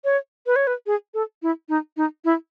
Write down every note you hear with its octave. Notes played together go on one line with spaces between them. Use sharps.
C#5
B4
C#5
B4
G#4
A4
E4
D#4
D#4
E4